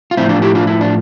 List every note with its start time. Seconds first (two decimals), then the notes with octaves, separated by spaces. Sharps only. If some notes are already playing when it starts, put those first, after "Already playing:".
0.11 F4
0.17 A2 F3 C4 E4
0.29 D4 F4
0.42 E4 G4
0.55 D4 F4
0.67 E4
0.81 D4